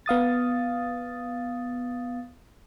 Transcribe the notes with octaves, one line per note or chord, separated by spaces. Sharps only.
B3 F5 D#6 A6